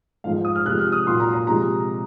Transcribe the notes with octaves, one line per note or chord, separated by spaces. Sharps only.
G#2 F3 G#3 F5
F5
D#6
F6
C3 F3 G#3 F#6
F6
D#6
A#2 F#3 C6
A#5
A#5
C3 F3 G#3 A#5